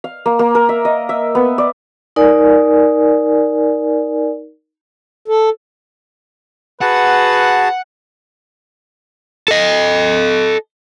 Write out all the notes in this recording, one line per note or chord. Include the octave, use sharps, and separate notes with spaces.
F5
A#3
A#3
A#4
E5
D#5
E5
B3
D5
D#4 A#4 D5 G#5
A4
F#4 G#4 B4 F#5 A5
A4 D#5